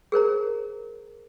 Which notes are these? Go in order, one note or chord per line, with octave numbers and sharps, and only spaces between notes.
G#4 A#4 C5 A#5